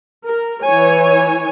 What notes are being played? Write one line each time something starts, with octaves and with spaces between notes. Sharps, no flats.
A#4
E3 C#5 G#5